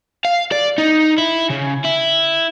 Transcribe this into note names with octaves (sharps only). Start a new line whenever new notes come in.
F5
D5
D#4
E4
C#3
E4